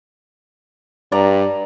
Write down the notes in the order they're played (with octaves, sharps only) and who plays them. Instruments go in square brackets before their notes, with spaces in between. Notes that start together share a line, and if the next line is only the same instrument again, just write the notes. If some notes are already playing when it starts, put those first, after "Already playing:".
[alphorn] G2 [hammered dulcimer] D5 A#5